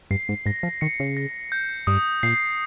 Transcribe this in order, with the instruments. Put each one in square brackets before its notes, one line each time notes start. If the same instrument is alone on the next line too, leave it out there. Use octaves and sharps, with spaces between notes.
[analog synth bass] G2 [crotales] C7
[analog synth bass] G#2
[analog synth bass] G#2 [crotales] A#6
[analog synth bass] F3
[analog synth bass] D#3 [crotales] C#7
[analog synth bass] C#3
[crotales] A#6
G6
[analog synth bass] G2 [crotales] D#6
[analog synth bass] A#2 [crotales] C7